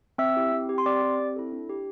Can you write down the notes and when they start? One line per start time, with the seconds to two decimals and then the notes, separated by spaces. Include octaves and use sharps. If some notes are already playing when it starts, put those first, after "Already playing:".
0.18 C4 E5 E6
0.36 E4 G4
0.52 C4
0.69 G4
0.78 C6
0.86 C4 D5 D6
1.02 G4
1.20 C4
1.36 E4 A4
1.52 D4
1.69 G4